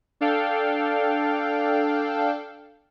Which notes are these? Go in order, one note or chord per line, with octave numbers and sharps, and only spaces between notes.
D4 A4 F5 G5